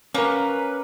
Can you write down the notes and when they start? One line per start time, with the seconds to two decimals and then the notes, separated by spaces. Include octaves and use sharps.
0.14 A#3 C#4 A#4 B4